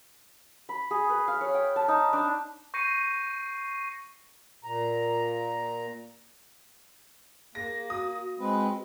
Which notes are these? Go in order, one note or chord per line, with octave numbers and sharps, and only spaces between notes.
B5
G#4
B4
F5
C#5
G5
A5
D#4
D4
C#6 G6 A#6 C7 C#7 D#7
A#2 A#5
A#3 G#4 A#6
F#4 D#6
F#4
G#3 C4 B4